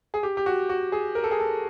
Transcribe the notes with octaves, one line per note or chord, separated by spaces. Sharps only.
G#4
G4
G4
F#4
F#4
G#4
A#4
A4
G#4
A4